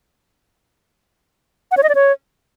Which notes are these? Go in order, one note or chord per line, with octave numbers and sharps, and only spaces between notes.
F#5
C#5
D#5
D5
C#5